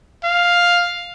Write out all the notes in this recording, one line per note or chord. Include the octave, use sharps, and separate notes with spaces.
F5